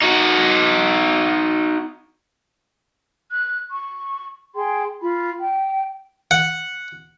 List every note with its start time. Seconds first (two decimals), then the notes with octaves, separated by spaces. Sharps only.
0.02 D#4 F#4
3.32 F#6
3.71 C#6
4.56 G#4 G5 C6
5.01 F4 B5
5.40 G5
6.31 F#5